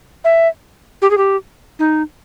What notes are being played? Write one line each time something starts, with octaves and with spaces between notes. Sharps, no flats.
E5
G4
G#4
G4
D#4